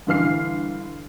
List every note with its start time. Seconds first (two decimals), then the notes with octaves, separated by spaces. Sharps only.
0.07 G2 D3 E3 F5 F6 C7